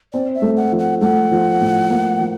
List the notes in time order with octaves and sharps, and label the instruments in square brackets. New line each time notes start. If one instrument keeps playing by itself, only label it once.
[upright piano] C4 [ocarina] D5
[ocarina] E5
[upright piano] A3
[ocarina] F#5
[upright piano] F3
[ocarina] F#5
[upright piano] A3 [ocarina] F#5
[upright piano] F3
A2
A#3
F3